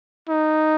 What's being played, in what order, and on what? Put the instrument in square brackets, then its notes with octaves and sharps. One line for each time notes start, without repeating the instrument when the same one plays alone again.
[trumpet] D#4